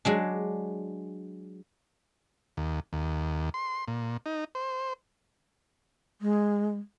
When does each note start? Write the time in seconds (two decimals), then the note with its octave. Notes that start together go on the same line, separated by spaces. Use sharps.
0.05 F#3 G#3 D4
2.57 D#2
2.93 D#2
3.54 C6
3.88 A#2
4.26 D#4
4.55 C5
6.21 G#3